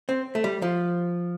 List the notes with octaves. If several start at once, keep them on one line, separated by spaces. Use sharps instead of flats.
C4
A3
G3
F3